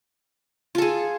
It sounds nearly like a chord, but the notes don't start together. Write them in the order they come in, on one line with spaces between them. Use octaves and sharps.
F4 A4 G#4